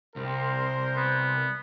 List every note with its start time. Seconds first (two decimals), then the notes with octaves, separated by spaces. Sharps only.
0.16 C2 A#4 C5 C6
0.96 B3